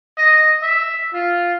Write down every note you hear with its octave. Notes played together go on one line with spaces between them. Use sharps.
D#5
E5
F4